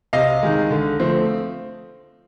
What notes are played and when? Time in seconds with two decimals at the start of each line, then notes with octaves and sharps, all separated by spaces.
0.13 C3 D#5 F5
0.43 D#3 G#3
0.71 D3
1.00 F3 A3 C4